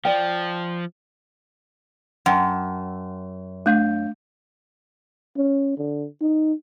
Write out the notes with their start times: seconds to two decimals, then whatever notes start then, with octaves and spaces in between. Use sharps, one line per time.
0.05 F3 D5 G5
2.26 F#2 F#5 G5 A5
3.66 A3 D4 F5 G6
5.37 C#4
5.78 D3
6.21 D#4